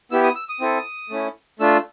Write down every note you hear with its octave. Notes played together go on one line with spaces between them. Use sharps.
B3 E4 G4 E6
D#6
E6
D#6
C4 E4 A4
A3 C#4 E4
A3 D4 F4 E6